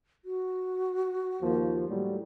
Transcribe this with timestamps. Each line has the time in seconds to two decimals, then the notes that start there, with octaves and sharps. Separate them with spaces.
0.25 F#4
1.41 D#2 F3 A#3
1.87 A2 F#3 G3